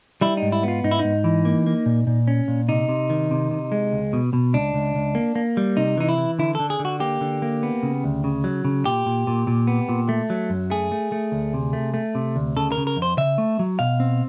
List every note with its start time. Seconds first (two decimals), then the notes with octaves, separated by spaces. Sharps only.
0.21 G3 E4
0.37 G#2 D#4
0.52 E4
0.63 B3 F4
0.84 G#2 D#4
0.91 E4
0.99 G#2 D#4
1.24 E3
1.45 A#3
1.66 A#3
1.86 A#2
2.07 A#2
2.28 C#4
2.48 A#2
2.69 C3 D#4
2.89 C3
3.10 D#3
3.31 C3
3.51 C3
3.72 G#3
3.93 C#2
4.13 B2
4.33 B2
4.54 C#2 D4
4.74 C#2
4.95 C#2
5.15 A#3
5.35 A#3
5.57 G3
5.77 C3 D#4
5.97 E3 D#4
6.09 E4
6.18 E3
6.39 D3 E4
6.55 D3 A4
6.70 G#4
6.79 D3
6.85 F#4
7.00 A#3 G4
7.21 D3
7.42 A#3
7.63 B3
7.83 C#3
8.04 D2
8.24 C#3
8.44 F#3
8.65 C#3
8.85 A#2 G4
9.06 A#2
9.27 A#2
9.47 A#2
9.67 B3
9.89 A#2
10.09 A3
10.30 F#3
10.50 F#2
10.70 A3 G#4
10.92 A3
11.12 A3
11.32 D2
11.54 C3
11.73 A3
11.94 A3
12.15 C3
12.36 D2
12.56 C#3 A4
12.72 A#4
12.77 C#3
12.87 A#4
12.96 F2
13.02 C5
13.17 C#3 E5
13.38 A3
13.59 F#3
13.79 B2 F5
14.00 C4